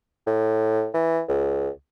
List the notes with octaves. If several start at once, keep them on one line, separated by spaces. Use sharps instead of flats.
A2
E3
C#2